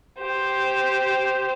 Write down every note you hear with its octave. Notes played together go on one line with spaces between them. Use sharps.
G4 C5